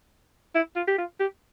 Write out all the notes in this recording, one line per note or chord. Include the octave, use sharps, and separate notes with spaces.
E4
F4
G4
F4
G4